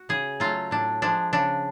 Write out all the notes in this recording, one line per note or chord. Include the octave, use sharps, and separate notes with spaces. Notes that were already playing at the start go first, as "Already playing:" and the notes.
Already playing: F#4
C#3 G#4
F#3 A3 F4
A2 D4
F3 G#3 D4
C#3 D4